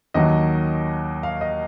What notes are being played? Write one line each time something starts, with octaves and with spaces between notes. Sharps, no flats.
D#2 D#3 F#3 D#5
F5
D#5